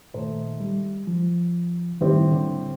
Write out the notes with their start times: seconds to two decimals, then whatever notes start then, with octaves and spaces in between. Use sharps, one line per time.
0.14 A#2 D#3 A3 D#4 A4 C5
0.60 G3
1.07 F3
2.01 A2 D#3 G3 C4 G4
2.32 D3